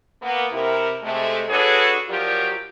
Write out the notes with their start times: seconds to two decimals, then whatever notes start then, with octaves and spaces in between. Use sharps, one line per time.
0.22 A#3 B3
0.52 C3 E4 A#4
1.02 C3 G#3 A3
1.49 D4 F#4 G#4 A4 B4 C#5
2.08 F3 F#3 F4 G4 A#4 D5